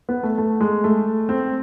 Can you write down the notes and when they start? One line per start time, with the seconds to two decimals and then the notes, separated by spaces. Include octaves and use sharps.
0.09 B3
0.23 A3
0.38 A3
0.61 G#3
0.84 A3
1.29 C4